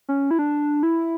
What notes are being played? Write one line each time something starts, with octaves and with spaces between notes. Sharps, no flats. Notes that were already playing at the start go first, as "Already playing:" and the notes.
C#4
E4
D4
E4